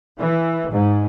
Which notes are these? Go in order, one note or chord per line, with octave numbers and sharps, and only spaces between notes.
E3
G#2